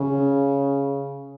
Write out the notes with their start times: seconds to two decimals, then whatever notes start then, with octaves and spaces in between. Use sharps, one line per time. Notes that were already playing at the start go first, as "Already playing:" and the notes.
Already playing: C#3